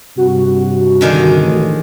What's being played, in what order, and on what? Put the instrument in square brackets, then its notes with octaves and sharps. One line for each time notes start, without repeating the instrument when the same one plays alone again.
[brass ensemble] G2 C3 [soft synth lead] F#4
[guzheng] D3 D#3 G#3
[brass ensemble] A1 D2